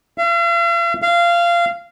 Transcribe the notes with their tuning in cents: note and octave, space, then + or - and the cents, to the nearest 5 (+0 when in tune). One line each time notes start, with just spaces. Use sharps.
F5 -45
F5 -20